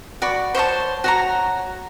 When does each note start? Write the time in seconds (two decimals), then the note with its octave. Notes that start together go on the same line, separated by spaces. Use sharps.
0.22 F#4 D5 B5
0.55 C5 C#5 D#5 A5
1.04 F#4 C#5 A#5